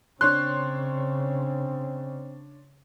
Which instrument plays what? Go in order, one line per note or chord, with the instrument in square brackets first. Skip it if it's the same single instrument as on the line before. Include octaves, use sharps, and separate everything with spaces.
[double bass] C#3 [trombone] C4 [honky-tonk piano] D4 C#5 C6 [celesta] F#6